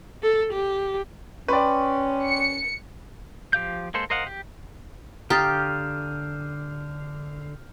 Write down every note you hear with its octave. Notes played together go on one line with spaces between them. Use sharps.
A4
G4
C#4 B4 D5 G5 C6 C#6
C#7
F3 G4 F5 G6
G#3 A#3 A4 C5
A#4 C5 D#5 F5 F#5
G4
D3 G4 F5 A#5 D#6 F6 G6 A6